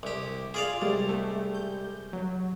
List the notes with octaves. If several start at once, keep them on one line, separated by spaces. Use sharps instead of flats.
C2 G4
F4 G#4 D5 F5
C2 G3 G#3 A6
A3
G6
F#3